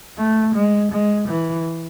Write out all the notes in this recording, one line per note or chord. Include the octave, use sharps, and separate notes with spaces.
A3
G#3
G#3
E3